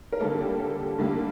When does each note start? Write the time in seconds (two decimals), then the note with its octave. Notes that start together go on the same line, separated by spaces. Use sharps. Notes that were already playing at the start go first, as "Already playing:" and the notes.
0.12 A#4
0.20 D3 G3 A#3 A4
0.40 G4
0.60 A4
0.79 G4
0.98 D3 G3 A#3